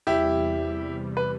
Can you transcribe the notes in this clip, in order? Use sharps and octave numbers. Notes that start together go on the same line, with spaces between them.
E2 C3 G3 E4 G4
B4